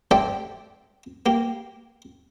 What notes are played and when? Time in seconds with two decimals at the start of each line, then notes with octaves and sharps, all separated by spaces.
0.11 G4 A4 C5 D5 E5 G5
1.26 A#3 G4